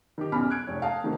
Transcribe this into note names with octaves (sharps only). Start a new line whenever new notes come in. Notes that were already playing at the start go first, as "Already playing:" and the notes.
D#3 G4
B1 E2 C#4 B5 F6
F#6 G#6 D7
F1 C#5
F5 G5 A5 A#5 D#6
C3 D#3 F#3 A3 A#3 C4